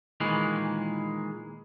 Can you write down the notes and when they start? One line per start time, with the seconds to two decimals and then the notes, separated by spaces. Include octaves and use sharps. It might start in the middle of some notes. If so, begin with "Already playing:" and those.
0.20 A#2 D#3 E3 G#3